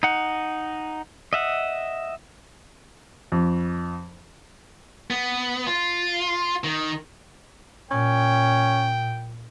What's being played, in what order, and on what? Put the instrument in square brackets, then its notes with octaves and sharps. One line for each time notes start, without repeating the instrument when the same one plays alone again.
[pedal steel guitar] D#4 F#5
D#5 E5 F#5
[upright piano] F2
[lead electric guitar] B3
F4
D#3
[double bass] A#2 [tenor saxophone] C#4 [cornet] G5